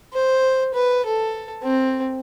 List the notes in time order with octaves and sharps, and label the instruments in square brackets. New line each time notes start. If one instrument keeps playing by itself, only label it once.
[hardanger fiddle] C5
B4
A4
C4